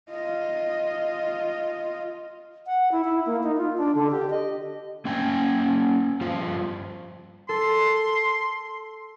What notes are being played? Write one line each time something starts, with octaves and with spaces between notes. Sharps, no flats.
F4 D#5
F#5
E4
E4
A#3
D#4
F4
D4
D3
G4
D#5
A#3 C#4 G5 G#5
G2 F4 C5
A4 C6